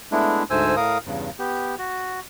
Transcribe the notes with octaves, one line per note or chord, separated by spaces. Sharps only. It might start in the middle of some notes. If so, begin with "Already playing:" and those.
G#3 A3 B3 D4 E4
D2 G#2 A3 C5 G#5 E6
A2 A#4 F5 D#6
E2 G2 C#3
B3 G4
F#4